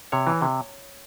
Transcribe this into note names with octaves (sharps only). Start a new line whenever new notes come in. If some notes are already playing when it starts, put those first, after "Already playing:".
C3 C#5
E3
C3